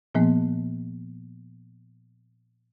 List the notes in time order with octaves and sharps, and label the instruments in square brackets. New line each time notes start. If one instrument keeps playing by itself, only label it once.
[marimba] A#2 F3 A#3 B3